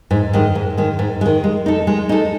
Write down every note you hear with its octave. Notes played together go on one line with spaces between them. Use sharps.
G#2
D#3 G#3
G#2
D#3 G#3
G#2
D#3 G#3
G#3
D#4 A4
G#3
D#4 A4